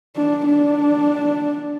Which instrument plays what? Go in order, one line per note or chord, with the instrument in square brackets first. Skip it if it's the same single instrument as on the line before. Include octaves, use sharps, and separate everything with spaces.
[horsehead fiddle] D4
D4